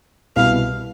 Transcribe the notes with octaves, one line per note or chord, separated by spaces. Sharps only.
C2 B2 G3 B3 E4 F5